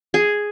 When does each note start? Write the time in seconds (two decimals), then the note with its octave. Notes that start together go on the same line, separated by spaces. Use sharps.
0.14 G#4